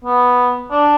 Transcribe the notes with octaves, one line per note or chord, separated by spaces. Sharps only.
B3
D4